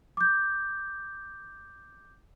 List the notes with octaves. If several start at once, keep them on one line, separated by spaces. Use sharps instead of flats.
D6 G6